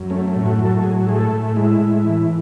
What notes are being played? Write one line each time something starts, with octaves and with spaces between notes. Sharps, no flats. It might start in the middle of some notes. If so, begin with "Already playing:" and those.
Already playing: F#2
A3 C#4
C#4
A2
F#4
F#3
A4
A4
A2 G#4
A3 G#4
A4
A2
G#3 E4
A2
E3